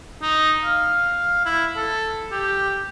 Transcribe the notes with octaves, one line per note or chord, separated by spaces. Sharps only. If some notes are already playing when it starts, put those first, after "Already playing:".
D#4
F5
E4
A4
G4